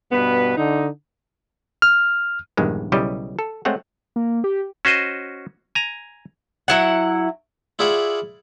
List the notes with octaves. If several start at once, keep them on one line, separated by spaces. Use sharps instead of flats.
G2 B2 B3 B4
D3 D#4
F6
A#1 E2 G2 D#3 G#3
B1 C#3 G3 E4 G4 D#5
A4
G#3 A3 C4 C#5 F#5
A#3
G4
C#4 F#4 C5 D#5
G#5 A#5
F#3 E4 F#5
E4 F4 G#4 D5 E5 F#5